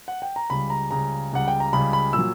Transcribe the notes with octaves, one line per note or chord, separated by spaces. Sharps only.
F#5
G5
A#5
C#2 C#3 G3 B5
A#5
C#2 C#3 G3 A#5
C#2 C#3 G3 F#5
G5
A#5
C#2 C#3 G3 B5
B5
A#2 F#3 E6